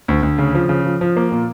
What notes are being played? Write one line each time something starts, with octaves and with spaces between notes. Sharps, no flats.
D2
D2
C#3
F3
C#3
F3
F3
A#3
A#2